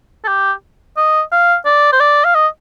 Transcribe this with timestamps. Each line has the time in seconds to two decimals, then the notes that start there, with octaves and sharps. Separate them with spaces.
0.24 A4
0.28 G4
0.97 D#5
1.32 F5
1.66 D5
1.92 C5
2.00 D5
2.25 F5
2.35 D#5